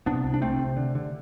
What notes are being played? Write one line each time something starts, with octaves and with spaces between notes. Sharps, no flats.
C3 B3 D4
C2
D4
C3 A3 C4
C3
D3
D3